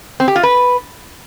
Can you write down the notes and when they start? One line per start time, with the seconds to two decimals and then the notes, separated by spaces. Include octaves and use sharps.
0.20 C4
0.28 G4
0.36 F4
0.43 B4